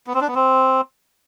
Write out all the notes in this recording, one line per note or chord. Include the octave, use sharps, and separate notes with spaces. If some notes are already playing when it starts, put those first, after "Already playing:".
B3
C4
D4
B3
C4